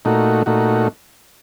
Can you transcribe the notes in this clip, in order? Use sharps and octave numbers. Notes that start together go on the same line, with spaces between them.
A#2 A3 D#4 F#4
A#2 A3 D#4 F#4